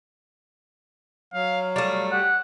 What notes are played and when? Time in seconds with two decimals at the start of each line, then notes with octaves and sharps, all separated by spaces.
1.34 F#3 F5
1.76 G3 A3 F5
2.12 G4 F#5